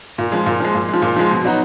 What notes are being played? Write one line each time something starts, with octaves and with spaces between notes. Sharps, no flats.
A#2
F3 G#3
A#2
F3 G#3
A#2
F3 G#3
A#2
F3 G#3
B2
F#3 B3 D#4 F#4